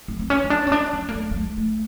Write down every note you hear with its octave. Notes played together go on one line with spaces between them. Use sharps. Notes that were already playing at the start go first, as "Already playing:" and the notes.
C4
C4
C#4
C#4
D4
C#4
D4
C#4
A#3
A3
A3
G#3
A3